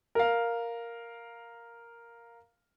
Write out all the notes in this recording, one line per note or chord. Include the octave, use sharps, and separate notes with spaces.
A#4 F5